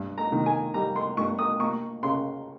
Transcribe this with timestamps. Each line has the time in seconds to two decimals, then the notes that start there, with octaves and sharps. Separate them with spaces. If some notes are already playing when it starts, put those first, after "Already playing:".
Already playing: G2
0.18 A#5
0.32 D#3
0.46 G#5
0.74 G3 A#5
0.96 C6
1.17 G2 C#6
1.39 D#6
1.59 A#3 C#6
2.03 C#3 C6